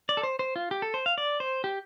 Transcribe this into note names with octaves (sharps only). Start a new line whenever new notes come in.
D5
A4
C5
C5
F4
G4
A4
C5
F5
D5
C5
G4